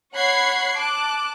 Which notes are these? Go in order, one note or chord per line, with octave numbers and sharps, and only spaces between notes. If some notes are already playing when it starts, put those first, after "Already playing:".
C#5 F#5 B5 F#6 G#6 C7
A5 D6 F#6